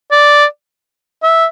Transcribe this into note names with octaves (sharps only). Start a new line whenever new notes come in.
D5
E5